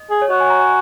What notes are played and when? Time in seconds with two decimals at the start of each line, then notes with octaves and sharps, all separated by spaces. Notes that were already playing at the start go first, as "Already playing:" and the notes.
Already playing: D#5
0.10 G#4
0.22 C#5
0.30 F#4 D#5
0.40 G#5
0.50 A#5
0.60 G#5